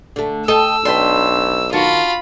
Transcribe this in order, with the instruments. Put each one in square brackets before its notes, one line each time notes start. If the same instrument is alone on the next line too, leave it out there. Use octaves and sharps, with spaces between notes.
[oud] D3 A3
[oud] A4 [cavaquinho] D#5 G5 [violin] E6
[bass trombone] B1 [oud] D4 [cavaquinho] B4 G5 C6
[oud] D#3 [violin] F4 B5 [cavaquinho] F#4 A5